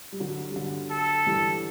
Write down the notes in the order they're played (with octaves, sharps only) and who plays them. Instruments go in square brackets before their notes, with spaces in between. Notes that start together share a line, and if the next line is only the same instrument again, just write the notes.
[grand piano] G3
D3 F#3
G3
D3 F#3
[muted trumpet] A4
[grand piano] E3 G3